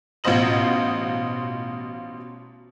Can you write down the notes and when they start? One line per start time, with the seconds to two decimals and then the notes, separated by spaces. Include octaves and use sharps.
0.24 A1 B2 F4 C5 D#5 F#7